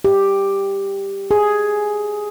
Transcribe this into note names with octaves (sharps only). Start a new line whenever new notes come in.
G4
G#4